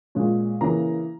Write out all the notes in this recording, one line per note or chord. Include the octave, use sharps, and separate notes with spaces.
A#2 G#3 C#4
C#3 E3 A#3 A#5